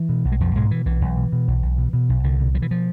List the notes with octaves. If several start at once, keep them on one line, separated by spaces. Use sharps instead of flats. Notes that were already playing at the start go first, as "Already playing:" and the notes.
Already playing: E3
B2
B1
G#3
B1 F2 F3
G#2 B2 G#3
B2 E3
B1 E3
B1
B2
B2
B1
B1
B2
B2
B1
C2 D3
B2
B2 F3
E3
F3